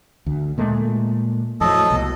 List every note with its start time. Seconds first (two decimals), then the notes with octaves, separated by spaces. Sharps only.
0.26 D2
0.58 A#2 G#3 A3
1.61 F2 A2 F#3 A4 D#5
1.91 C2 B2